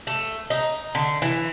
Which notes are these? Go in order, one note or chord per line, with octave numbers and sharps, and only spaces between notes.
A3
D#4
D3
E3